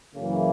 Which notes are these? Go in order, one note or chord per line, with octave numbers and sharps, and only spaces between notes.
F#2 C#3 E3 A#3